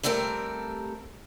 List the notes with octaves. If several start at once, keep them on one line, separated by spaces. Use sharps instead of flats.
G3 A3 C4 G4 A4 A#4